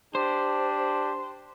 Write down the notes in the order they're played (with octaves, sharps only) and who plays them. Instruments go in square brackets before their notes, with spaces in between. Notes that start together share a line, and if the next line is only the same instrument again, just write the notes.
[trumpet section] D4 G4 [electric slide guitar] C5